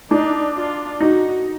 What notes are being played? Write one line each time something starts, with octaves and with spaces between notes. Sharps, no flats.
D4 D#4
F4
D#4 F#4